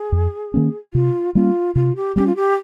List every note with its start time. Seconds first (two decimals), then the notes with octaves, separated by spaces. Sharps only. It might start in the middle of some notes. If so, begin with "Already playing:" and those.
Already playing: G#4
0.12 F2
0.54 D#3 A#3 C#4
0.93 C3 F4
1.35 G3 A#3 C#4 F4
1.75 C3 F4
1.96 G4
2.16 G3 A#3 G4
2.20 C#4
2.26 F4
2.36 G4